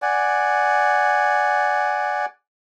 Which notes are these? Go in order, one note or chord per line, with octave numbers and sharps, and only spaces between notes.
D5 F#5 G#5